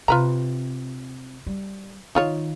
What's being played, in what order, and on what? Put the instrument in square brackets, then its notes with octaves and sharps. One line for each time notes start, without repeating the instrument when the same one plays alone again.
[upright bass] C3 [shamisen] F4 B4 A#5
[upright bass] G3
[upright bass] D#3 [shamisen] D#4 F4 C#5